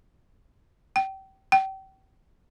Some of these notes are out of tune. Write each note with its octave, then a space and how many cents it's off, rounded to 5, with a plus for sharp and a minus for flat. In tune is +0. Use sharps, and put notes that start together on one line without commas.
G5 -30
G5 -35